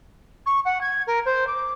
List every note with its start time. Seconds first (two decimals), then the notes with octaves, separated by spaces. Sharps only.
0.46 C#6
0.65 F#5
0.81 G#6
1.07 A#4
1.25 C5
1.47 D6